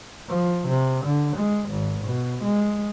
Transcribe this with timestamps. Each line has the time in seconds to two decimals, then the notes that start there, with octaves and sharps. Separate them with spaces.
0.29 F3
0.68 C3
1.05 D3
1.37 G#3
1.70 G#1
2.04 B2
2.44 G#3